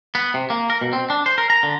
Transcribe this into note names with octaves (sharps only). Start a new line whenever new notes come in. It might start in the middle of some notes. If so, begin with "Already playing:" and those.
B3
C3
A#3
A#4
B2
C4
D4
C5
A#4
A#5
D3